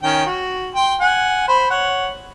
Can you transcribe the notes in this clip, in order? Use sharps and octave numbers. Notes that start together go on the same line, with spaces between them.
D#3 C#4 G5
F#4
G5 C6
F#5 G#5
C5 B5
C#5 F#5